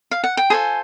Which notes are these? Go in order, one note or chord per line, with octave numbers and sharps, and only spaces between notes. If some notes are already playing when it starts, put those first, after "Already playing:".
F5
F#5
G5
F4 G#4 A4 C5 G#5